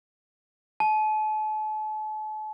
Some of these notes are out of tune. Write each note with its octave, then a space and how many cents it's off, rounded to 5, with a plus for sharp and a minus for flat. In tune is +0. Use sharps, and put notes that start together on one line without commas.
A5 -40